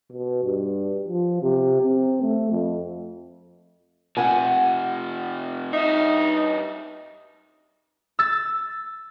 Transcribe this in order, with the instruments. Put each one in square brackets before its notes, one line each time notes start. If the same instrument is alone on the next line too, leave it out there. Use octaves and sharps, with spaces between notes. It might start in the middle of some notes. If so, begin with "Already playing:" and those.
[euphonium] B2
G2
F3
C3
C4
A3
F2
[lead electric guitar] C3 F3 [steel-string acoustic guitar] F#5 G#5
[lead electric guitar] G2 E5 [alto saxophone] D#4
[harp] E6 A6